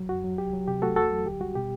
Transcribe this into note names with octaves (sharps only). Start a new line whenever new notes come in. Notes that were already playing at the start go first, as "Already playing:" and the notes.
Already playing: F#3
F#2 F#4
F#3
C2 G4
F#3
C3 G4
A3 F#4 A4
E2 F#4 A4
F#3
D2 G4
G3 F#4
B2 G4